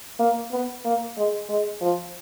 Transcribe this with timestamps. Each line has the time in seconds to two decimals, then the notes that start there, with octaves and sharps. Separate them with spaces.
0.19 A#3
0.52 B3
0.85 A#3
1.17 G#3
1.49 G#3
1.81 F3